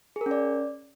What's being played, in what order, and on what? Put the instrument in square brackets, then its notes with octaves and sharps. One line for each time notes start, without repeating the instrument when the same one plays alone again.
[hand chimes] G#4
A#4
C#4
D5